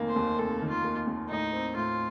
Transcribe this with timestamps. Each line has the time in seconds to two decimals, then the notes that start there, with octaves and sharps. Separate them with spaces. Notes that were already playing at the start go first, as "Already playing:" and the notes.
Already playing: F1 D#3 A#3
0.08 C5
0.16 D#2
0.38 F1 A4
0.62 D#3
0.69 F4
0.84 A#3
1.07 D#2
1.29 A2 D#4
1.53 C4
1.76 A2 F4